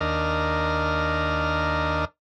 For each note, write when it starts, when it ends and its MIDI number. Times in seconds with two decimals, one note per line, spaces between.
0.01 2.05 39
0.01 2.05 62
0.01 2.05 70
0.01 2.05 75
0.01 2.05 89